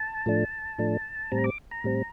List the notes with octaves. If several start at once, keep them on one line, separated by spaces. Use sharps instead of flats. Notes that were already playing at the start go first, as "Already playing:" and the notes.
Already playing: A5
A2 F3 A3 D4
A2 F3 A3 D4
A2 G3 C4 A#5
D6
A#5
A2 G3 C4